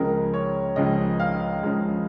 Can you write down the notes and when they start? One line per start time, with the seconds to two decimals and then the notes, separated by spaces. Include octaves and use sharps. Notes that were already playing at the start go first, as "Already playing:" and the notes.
Already playing: C#2 C#3 F3 G#3 A#4
0.34 C#5
0.76 C#2 C#3 F3 G#3 D#5
1.20 F5
1.63 C#2 C#3 F3 G#3